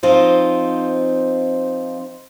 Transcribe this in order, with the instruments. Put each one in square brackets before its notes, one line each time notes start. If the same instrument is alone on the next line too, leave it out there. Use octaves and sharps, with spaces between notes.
[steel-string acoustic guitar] F3 C4 D#4 F4